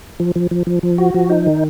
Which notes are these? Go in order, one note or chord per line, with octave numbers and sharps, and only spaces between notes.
F3
F3
F3
F3
F3
F#4
F3
D#4
D#3